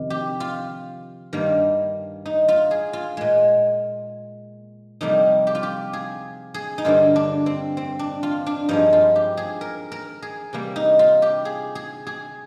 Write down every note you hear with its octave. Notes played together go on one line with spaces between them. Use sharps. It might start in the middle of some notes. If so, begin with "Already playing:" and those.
Already playing: F2 C3 D#3
G4
F4
G2 D#3 G3 A#3
D#4
F4
G#4
F4
A#2 G#3
F2 C3 G3 A#3 D#4
G4
F4
G4
G#4
G#4
D#4
G2 D3 G3 A#3 F4
D4
C4
C4
D4
F4
D4
G2 F3 G#3 D#4
F4
G4
G#4
A#4
A#4
G#4
C3 G3 A#3
D#4
F4
G4
G#4
G#4
G#4